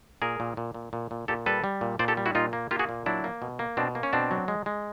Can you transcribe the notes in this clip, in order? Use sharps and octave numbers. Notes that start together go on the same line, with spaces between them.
A#2 G#4 A#4
A#2
A#2
A#2
A#2
A#2
A#2 G4 A4
G3 A4 B4
G3
A#2
A#2 C5 D5
G4 A4
G3
E4 F#4
A#2 D#4 F4
A#3
A#3 F4 G4
F#4 G#4
A#2
F#3 D4 E4
A#3
B2
A#3
B2 C4 D4
A#3
C#4
B2 C4 D4
F#3
G#3
G#3